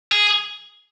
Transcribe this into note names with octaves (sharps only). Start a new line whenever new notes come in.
G#4